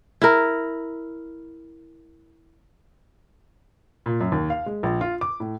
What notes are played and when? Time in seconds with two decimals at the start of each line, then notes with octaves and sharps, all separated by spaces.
0.22 E4 A#4
4.06 A#2
4.21 F#2
4.32 D#2
4.50 F5
4.66 G#3
4.83 A#1
5.01 F4
5.21 D6
5.40 A2